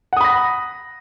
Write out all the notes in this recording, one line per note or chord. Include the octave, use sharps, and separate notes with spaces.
F#5 B5 D#6 A#6